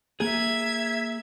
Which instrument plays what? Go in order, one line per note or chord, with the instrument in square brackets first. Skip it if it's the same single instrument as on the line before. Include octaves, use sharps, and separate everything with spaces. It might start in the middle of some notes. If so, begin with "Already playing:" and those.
[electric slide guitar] A#3 G#4 [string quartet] E5 G#6